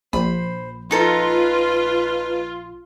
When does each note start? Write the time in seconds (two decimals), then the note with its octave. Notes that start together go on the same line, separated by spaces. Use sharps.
0.13 A#1 C5 B5
0.91 D#4 F4 A4 B4 A#5